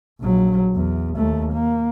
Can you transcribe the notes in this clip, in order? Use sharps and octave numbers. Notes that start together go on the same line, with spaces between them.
A#1 F#3
E2
D#2 A3
A#3